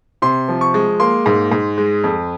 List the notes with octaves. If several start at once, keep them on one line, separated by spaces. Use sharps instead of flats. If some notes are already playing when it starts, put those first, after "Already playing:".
C3 C6
F3
C#6
G#3
A#3 C6
G#2
G#2
G#3
F2